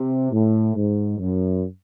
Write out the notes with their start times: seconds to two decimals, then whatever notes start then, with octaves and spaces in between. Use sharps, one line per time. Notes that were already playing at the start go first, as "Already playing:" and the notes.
Already playing: C3
0.31 A2
0.75 G#2
1.19 F#2